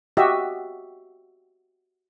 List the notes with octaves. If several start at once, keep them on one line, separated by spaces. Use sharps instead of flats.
F#4 G4 D#5 E5